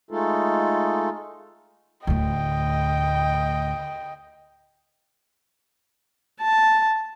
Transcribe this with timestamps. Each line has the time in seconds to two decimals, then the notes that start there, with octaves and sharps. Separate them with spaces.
0.11 G#3 A3 D#4 F4 A4
2.07 D2 A2 D#5 G5
6.42 A5